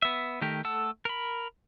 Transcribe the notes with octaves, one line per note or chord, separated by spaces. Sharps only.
B3 E5
D#3 A3 G4 A#4
A3 A4 F#5 A5 E6
A#4 B5